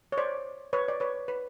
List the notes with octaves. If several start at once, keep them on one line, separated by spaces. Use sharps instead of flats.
C#5
C5 D5
B4 C#5
D5
B4 C#5
B4